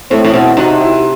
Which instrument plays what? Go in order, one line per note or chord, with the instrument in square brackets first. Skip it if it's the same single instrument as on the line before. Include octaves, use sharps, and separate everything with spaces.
[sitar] A2 [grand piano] A3 C4
[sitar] A2
[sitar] B2 [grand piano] C4 E4
[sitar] C3 [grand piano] D#4 F#4
[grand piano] E4 G4